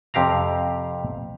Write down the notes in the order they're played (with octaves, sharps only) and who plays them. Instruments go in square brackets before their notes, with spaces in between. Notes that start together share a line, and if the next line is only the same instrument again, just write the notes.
[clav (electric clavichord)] F2 C3 G4 F5 A#5